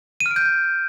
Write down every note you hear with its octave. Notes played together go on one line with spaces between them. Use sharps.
D#7
F6
D7
G6